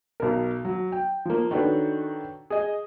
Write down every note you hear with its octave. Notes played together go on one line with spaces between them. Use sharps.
B1 A#4
F#3
G5
F3 A#3
D#3 D4 F#4 A4 B4 C#5
G#4 D#5